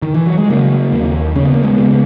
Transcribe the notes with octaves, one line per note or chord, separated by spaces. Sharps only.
D#3
E3
F#3
G#3
C#3 F#3 A#3
D#2
C#3 C#4
B3
A#3
G#3 B3
C#3